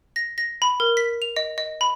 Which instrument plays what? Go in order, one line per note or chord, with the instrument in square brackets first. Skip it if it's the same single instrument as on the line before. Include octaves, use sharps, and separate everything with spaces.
[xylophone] A#6
A#6
B5
A#4
B6
F7
D#5
D#5
B5